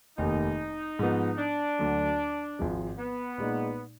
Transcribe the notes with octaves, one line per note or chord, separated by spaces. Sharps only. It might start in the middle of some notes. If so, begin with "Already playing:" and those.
F1 D#2 D#3 D#4
G#2 F3 B3
D4
D2 D3 F#3
G#1 G#2 F3 G#3
B3
A#2 G#3 D#4